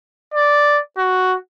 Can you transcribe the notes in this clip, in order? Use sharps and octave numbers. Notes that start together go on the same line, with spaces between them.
D5
F#4